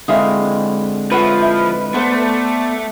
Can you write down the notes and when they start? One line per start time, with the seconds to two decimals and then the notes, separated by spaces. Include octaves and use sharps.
0.08 D3 G#3 C4 E4 F5 D#6
1.12 F3 B4 C#5 E5 F#5
1.42 E4
1.94 A3 B3 C5 D5